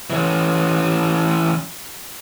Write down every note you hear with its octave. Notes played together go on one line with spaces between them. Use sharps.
E3 C#4